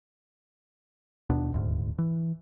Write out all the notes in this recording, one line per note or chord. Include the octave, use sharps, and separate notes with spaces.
D#2 B2 B3 D4
D#1 D2 G#2
E3